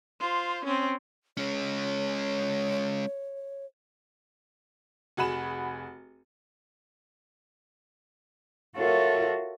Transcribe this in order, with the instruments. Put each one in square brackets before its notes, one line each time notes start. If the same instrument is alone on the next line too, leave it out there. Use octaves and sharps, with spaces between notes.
[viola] F4 C5
C4 C#4
[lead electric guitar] G#3 C#4 [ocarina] C#5
[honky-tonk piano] F1 F#4 G#4 F#5 B5 E7
[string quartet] F4 F#4 A4 A#4 C#5 E5